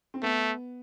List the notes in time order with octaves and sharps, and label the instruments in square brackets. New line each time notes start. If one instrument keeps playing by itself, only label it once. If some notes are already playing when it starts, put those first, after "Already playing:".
[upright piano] C4
[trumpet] A3 [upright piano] B3